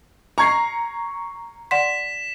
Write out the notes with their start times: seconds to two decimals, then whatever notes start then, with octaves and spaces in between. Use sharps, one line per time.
0.38 A#5 C#6 G#6 C7
1.71 D5 F#5 C6 B6 E7